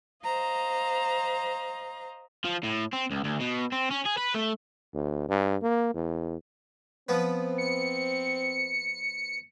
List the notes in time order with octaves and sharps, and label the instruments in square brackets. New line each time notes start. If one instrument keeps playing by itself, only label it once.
[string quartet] C5 D#5 F5 A#5
[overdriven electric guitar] F3
A2
C4
C#2
D2
B2
C4
C#4
G#4
B4
A3
[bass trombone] D2
G2
A#3
E2
[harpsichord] F3 B3 B4 [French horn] C4
[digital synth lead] C#7